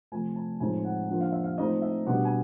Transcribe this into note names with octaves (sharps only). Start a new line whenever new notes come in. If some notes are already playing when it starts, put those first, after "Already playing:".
C3 F3 A3 G#5
A5
A2 F3 G#3 C4 D#4 G#5
F#5
D3 F3 A#3 F#5
F5
E5
F5
F3 A3 C4 D#4 D#5
E5
B2 G3 B3 D4 F#5
G#5